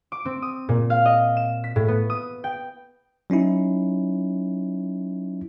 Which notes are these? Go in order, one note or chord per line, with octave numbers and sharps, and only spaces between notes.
D6
C4
D#6
A#2
F5
D#5
E7
B6
A2
B3
D#6
G5
F#3 C#4 D#4 E4